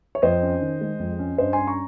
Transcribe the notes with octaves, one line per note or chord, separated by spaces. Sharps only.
C#5
F2 C5 D#5
C#4
D#3
G#3
F2
C#4
G2 C5 D#5
C#4 G#5 C6
A#5 C#6